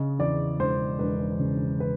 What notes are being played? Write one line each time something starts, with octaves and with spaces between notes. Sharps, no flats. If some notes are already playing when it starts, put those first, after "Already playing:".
Already playing: C#3 D#5
E2 D5
E1 C5
E1 B4
C#3
B4